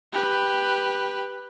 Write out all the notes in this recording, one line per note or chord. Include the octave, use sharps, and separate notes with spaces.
G4 B4